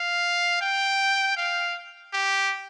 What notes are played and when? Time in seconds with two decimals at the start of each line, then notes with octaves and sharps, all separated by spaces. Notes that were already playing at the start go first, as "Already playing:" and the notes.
Already playing: F5
0.61 G5
1.37 F5
2.13 G4